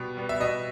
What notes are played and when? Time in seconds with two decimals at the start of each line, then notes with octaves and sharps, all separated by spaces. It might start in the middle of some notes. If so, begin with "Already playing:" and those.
Already playing: B2 G3 B3
0.17 G3 B3
0.29 E5
0.40 B2 D#5